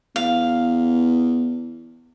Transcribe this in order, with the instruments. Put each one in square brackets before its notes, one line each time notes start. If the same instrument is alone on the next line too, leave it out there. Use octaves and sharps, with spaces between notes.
[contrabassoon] E2 [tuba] B3 [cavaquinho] F5